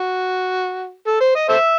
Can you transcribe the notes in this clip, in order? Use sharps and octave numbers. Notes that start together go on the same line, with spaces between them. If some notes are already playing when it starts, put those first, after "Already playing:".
Already playing: F#4
A4
C5
D#5
A4 C5 E5